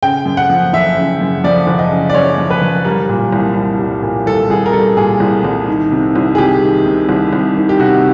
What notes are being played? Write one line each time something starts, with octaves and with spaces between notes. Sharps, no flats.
C#3 G5
F#2
F#5
F3
F#1 E5
C#3
F#2
F3 D5
F#1
D#5
C#3
D5
F#2 C#5
F3
B4
F#1
G3 A#4
A#2
C2
C2
G3
A#2
C2 A4
C2 G#4
A#4
G3 A4
A#2 G#4
C2
C2
D#3
C3
C2
G#4
C2 G4
D#3
C3
C2
C2
D#3
G4
C3 F#4